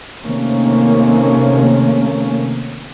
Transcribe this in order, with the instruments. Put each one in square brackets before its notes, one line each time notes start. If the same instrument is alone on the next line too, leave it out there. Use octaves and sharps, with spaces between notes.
[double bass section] C3 D#3 A3 A#3 C#4